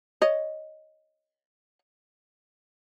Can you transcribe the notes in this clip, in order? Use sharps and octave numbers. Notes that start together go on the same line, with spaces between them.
C#5 D#5